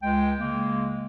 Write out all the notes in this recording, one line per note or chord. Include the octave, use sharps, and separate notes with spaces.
C#2 G#3 G5
C#3 G#3 A#3